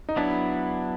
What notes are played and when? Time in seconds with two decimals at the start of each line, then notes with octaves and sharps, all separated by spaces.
0.09 D#4
0.16 F#3 B3 D4 E4